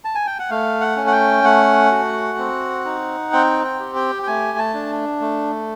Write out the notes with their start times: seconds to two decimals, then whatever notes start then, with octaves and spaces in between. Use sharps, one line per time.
0.05 A5
0.15 G#5
0.26 G5
0.39 F#5
0.50 A3 F5
0.81 F#5
0.97 C#4
1.07 F#5
1.12 G5
1.44 A3 F#5
1.91 F#4
2.38 C4
2.85 D#4
3.33 C4 G5
3.65 G5
3.79 G4
3.95 G5
4.23 G5
4.27 A3 G#5
4.58 A5
4.74 D4
5.20 A3